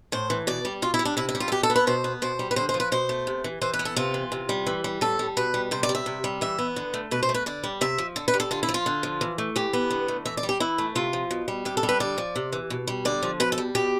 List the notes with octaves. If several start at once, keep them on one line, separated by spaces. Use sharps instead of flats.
A2 C5
E3
B2 D5
G3
B2 F4
E4
G3
D4
C3 E4
E4
G3
F4
A4
B2 G4
A4
B3
B4
B2 C5
B3
B2 C5
G3
B4
D3 C5
C5
F3
B4
B2 C5
A3
C3
E3
E3 C5
B4
B3
A4
C3 F4
E3
C3
G3
E3
G3
A2 A4
G3
B2 B4
G3
C3 C5
D5
G3
E5
C3
G3
E3 E5
B3
D3
A3
B2 B4
C5
A3
B4
D3 D5
G3
C3 E5
F3
D3 A4
B4
G3
A4
D3 F4
E4
F3
F4
D3
F3
E3
A3
E3 G4
B3
D3
A3
E3 E5
D5
G3
G4
E3 E4
A3
C3 F4
F3
B2
G3
C3 G4
A4
G3
B4
D3 D5
F3
C3
E3
B2
G3
D3 D5
F3
B2 B4
A4
G3
B2 G4